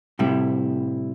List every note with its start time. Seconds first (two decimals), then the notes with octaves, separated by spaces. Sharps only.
0.19 A2 C3 G3 E4